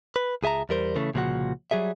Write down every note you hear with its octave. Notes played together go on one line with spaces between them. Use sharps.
B4
C#2 G#4 E5 A5 A#5
E2 G3 A#4 C5
C#3 E3 A3
C2 A#2 C#3 F3 F#4 F#5
F#3 G3 G#4 E5